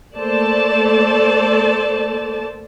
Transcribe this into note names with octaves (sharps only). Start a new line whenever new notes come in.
A3 A#3 A4 C5 D5 A5